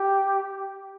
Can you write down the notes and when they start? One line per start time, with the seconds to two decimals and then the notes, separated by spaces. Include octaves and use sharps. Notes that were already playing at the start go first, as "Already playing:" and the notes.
Already playing: G4